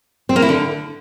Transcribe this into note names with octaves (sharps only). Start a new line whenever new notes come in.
C4
A#3
E4
D3